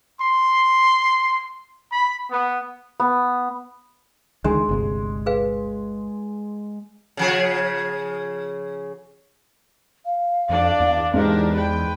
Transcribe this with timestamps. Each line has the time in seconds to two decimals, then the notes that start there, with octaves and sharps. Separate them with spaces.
0.19 C6
1.90 B5
2.30 B3
3.00 B3
4.44 C#2 D3 D#3 G#3 D4
4.69 G1 D2 C3
5.26 G#4 B4 F5
7.17 C#3 F3 G#4
10.06 F5
10.49 F2 D4 D5
10.80 E2
11.14 E2 G#2 G#3 D4 G4 A#4
11.54 B4 G5